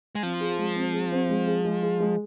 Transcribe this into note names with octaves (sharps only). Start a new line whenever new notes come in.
G#3
F3 C4
G#4
G#3
C4
G#4
C4
G#3
G#4
G#3
G#4
G#3